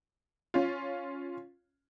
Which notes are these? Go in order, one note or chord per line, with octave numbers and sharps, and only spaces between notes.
C#4 F4